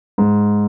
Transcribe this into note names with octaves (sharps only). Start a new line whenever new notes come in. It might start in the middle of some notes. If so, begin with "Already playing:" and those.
G#2